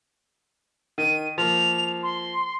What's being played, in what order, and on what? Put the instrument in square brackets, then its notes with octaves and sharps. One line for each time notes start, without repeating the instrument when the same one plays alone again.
[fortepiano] D#3 [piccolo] D#7
[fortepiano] F3 A#3 [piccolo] F7
[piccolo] C6